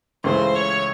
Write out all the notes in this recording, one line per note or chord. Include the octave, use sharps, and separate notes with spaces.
C#2 C#3 E3 A3 C5
C#5